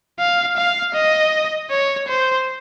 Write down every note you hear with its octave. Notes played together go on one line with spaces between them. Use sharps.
F5
F5
D#5
C#5
C5